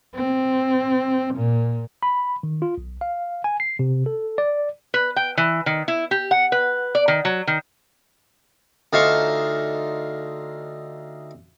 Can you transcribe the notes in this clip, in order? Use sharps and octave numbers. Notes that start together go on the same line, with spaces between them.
C4
A#2
B5
D#3
F4
B1
F5
G#5
C7
C3
A4
D5
B4
G5
E3
D#3
E4
G4
F#5
B4
D5
D#3
F#3
D#3
D2 D#4 F4 C5 A5 C#6